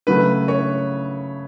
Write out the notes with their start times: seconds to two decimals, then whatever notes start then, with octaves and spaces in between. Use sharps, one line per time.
0.07 C#3 F#3 A3 B4
0.48 C#5